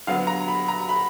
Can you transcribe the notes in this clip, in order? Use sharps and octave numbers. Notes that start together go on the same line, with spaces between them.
D3 F#3 B3 F5
A#5
B5
A#5
B5